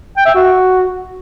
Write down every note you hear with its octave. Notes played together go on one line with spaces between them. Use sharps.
G5
E5
F#4